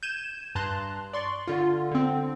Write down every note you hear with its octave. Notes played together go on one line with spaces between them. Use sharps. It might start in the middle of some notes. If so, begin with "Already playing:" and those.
G6 G#6 D#7 E7
G2 A5 A#5 C6 F#6
D5 C6 C#6
D3 F4
D3 C4